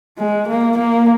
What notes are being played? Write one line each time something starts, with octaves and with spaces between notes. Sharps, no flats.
G#3
A#3
A#3